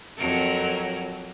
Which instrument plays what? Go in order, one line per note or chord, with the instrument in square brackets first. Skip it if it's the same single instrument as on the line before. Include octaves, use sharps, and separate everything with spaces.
[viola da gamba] F2 F#3 A#4